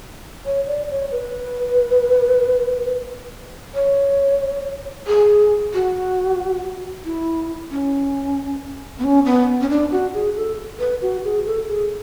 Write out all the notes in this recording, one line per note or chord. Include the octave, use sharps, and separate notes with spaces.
C#5
D5
C#5
B4
C#5
G#4
F#4
E4
C#4
B3
C#4
B3
C#4
D4
F#4
G#4
A4
B4
F#4
G#4
A4
G#4